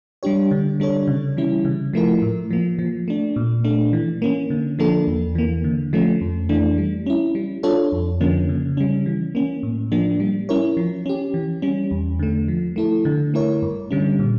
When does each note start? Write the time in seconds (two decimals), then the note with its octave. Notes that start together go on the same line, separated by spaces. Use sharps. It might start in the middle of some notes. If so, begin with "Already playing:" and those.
0.23 G3 D4 G4 C#5
0.51 D3
0.80 G3 D4 A4 C#5
1.08 C#3
1.37 E3 G3 C#4 E4
1.65 C#3
1.93 F3 A3 E4 A#4
2.22 A2
2.51 F3 A#3
2.79 F3
3.08 A3 D4
3.36 A#2
3.64 A3 D4
3.93 E3
4.22 A#3 C#4
4.50 D3
4.79 F3 A#3 D4 A4
5.07 E2
5.35 E3 A#3
5.64 D3
5.93 F3 A3 C#4
6.21 F2
6.49 E3 A3 D4
6.78 G3
7.06 C#4 E4
7.35 G3
7.63 D4 F4 A4 C#5
7.92 F2
8.21 D3 F3 A#3 C#4
8.49 C#3
8.77 G3 C#4
9.06 E3
9.35 A#3 C#4
9.63 A2
9.92 F3 A#3 D4
10.20 G3
10.49 C#4 E4 A#4 C#5
10.77 F3
11.06 C#4 G4
11.34 E3
11.62 G3 C#4
11.91 E2
12.19 D3 A3
12.48 F3
12.76 A3 E4 A4
13.05 D3
13.34 A3 E4 A#4 C#5
13.62 G2
13.91 D3 G3 C#4
14.19 A#2